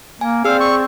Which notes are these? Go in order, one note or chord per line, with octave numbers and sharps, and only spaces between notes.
A#3 G#5
C4 G#4 D5 F5 E6
C#6